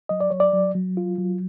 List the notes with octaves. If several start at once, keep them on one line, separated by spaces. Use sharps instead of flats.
F#3 D#5
D5
F#3 C#5
D5
F#3
F#3
F4
F#3